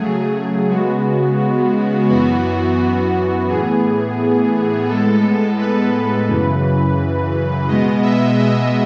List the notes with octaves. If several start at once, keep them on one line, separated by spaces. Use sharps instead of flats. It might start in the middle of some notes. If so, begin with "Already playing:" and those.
Already playing: C#3 F#3 A3 G#4
C#3 G#3 B3 F#4
F#2 E3 B3 F#4
A2 E3 B3 G#4
A2 G#3 B3 A4
B4
F#2 C#3 E3
B2 G#3 B3 D#5
E5
D#5